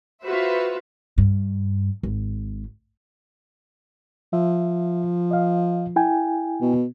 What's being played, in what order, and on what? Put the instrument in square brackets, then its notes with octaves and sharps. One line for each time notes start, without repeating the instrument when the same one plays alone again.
[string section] F4 F#4 B4 C5 E5
[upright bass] G2
G#1
[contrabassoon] F3 [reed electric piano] E5
[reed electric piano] D#5 F5
E4 G5 G#5
[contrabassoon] B2